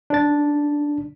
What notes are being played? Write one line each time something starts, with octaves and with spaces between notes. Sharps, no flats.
D4 A6